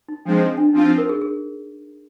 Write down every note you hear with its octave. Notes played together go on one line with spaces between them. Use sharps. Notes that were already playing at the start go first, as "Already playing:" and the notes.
D#4
F3 G#3 C4 D4
D#4
D4
D#4
F3 C4 D4 F4
D#4
A#4
G#4
G#4